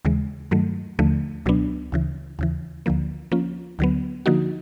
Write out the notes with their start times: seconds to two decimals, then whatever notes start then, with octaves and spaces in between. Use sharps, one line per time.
0.05 D#2 C#3 E3 G#3
0.51 G2 D#3 F#3 A3
0.99 D#2 D3 F3 A3
1.46 C#2 B2 F#3 B3 D4
1.92 D2 C#3 E3
2.39 D#2 C#3 E3
2.86 D2 D3 F3 A#3
3.32 F3 A#3 C#4 F4
3.79 D2 D3 F#3 B3
4.26 D3 F3 A#3 D#4 F#4